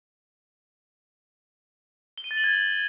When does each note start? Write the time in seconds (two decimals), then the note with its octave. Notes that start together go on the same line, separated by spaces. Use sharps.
2.18 G7
2.24 D#7
2.31 A6
2.37 F#7
2.44 G#6